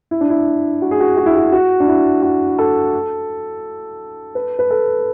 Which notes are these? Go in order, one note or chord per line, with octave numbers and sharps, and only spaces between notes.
E4
D4
E4
F#4
G#4
F#4
F#4
E4
F#4
F#4
D4
E4
F#4
A4
B4
B4
A4